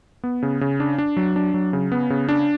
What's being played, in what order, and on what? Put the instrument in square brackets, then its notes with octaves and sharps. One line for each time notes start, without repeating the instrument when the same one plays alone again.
[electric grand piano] B3
C#3
C#3
D4
D4
F#3
D4
F#3
C#3
B3
C#3
D4